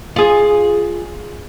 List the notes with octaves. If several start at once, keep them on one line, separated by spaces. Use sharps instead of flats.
F4 G#4